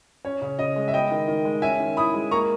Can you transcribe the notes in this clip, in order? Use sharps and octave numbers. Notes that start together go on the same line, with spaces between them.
C#4 C#5
C#3
C#3 D#5
G#3
E5
B3 D#5 G5
D#3
D#3
G#3
C#4 E5 G#5
D#3
E4 B5 D#6
G#3
A#3 A#5 C#6